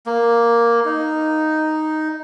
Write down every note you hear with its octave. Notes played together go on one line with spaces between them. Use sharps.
A#3
D#4